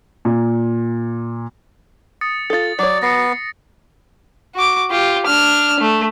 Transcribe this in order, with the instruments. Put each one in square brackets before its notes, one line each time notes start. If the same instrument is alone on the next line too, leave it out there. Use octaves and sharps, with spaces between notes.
[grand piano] A#2
[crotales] D#6 A6 C#7
[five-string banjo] F4 A4 [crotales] D#6 A6
[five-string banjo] F#3 C#5 [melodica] D5
[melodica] B3 [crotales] A#6 C7 C#7
[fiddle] F#4 D6
F4 G4
D4 F6
A3